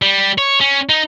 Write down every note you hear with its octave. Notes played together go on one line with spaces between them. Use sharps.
G3
C#5
C#4
D#4